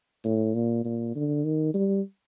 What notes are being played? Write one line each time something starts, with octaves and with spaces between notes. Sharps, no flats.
A2
A#2
A#2
D3
D#3
G3